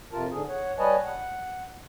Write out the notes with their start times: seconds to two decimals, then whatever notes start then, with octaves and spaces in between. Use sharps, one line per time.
0.12 F2 C3 F4 A#4 A5
0.31 G#2 D3 G#4
0.49 C#5 F#5
0.78 G3 B4 C#5 D#5 G#5 A5
1.05 F#5